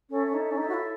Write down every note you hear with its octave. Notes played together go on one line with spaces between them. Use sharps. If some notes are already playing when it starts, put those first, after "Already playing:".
C#4 A4 C#5 E5
C#4
D#4
C#4
D#4 A4 C#5 E5
F#4
E4